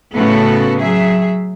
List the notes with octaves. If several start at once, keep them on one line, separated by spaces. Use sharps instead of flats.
A2 C#3 B3 F#4 A4
F#3 G#4 E5